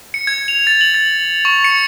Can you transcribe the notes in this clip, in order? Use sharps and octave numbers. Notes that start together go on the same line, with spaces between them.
C#7
G#6
F7
A6
F#7
A6
C#6
C#7